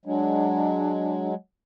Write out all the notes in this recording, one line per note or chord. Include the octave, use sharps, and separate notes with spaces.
F#3 G#3 D4